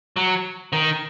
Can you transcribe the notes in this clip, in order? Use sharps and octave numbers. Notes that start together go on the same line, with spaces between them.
F#3
D#3